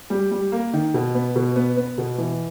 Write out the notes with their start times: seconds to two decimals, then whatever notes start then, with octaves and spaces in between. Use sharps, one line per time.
0.10 G3
0.31 G3
0.52 A#3
0.73 D#3
0.94 B2
1.15 B3
1.36 B2
1.56 B3
1.77 B3
1.98 B2
2.18 E3